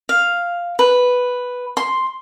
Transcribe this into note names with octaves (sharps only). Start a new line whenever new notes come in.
F5
B4
C6